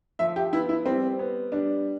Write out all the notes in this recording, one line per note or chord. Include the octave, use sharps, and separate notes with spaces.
F3 E5
G4
B3 E4
E4
G3 C4
B3
G3 D4